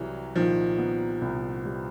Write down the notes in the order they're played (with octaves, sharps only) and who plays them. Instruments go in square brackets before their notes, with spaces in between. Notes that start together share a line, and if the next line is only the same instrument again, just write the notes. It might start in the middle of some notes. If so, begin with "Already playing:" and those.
Already playing: [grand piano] C2 G3 [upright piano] E3 F#3
[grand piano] A#2 [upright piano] D#3 F3
[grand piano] B3
C2
G3